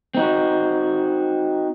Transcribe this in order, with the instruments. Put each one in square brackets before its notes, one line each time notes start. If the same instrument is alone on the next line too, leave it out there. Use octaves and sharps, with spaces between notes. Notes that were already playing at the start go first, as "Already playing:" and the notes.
[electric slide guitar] C4 D#4 F#4